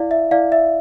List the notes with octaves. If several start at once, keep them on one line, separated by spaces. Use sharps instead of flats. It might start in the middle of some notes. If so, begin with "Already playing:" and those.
Already playing: E4 D5 F5
E5
E4 D5 F5
E5